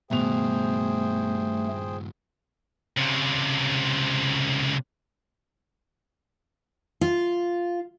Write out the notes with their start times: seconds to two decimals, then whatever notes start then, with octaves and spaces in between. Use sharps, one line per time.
0.11 G2 B2 D#3 A3 G#4 C5 G5 F7
2.97 C#2 C3
7.01 F4